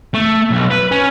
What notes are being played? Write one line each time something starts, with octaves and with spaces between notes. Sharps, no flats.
A3
B1
B4
C#4